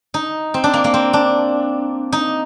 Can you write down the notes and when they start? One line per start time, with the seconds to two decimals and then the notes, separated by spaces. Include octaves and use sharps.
0.14 D#4
0.54 C4
0.64 D4
0.73 A#3
0.84 A#3
0.94 C4
1.13 D4
2.12 D#4